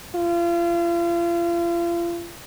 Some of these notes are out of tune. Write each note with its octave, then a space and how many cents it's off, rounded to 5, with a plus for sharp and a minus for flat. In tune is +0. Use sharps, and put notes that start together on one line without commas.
F4 -35